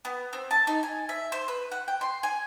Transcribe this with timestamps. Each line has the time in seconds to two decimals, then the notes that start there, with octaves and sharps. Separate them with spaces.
0.05 B3
0.33 C4
0.51 A5
0.67 D#4
0.83 G#5
1.09 E5
1.32 C5
1.48 B4
1.72 F#5
1.88 G5
2.01 C6
2.23 G#5